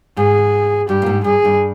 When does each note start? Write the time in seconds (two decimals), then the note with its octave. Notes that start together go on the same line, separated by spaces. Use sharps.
0.17 G#2 G#4
0.88 G2 G4
1.02 A#2
1.06 G#2
1.24 G2 G#4
1.45 G2